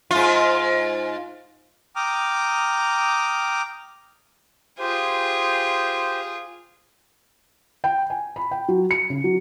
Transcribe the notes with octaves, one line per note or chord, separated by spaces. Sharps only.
G#2 F4
G5 A#5 D6 D#6 F6
F4 G4 G#4 C5
G5
G#5
B5
G5
F#3
C#7
C#3
F#3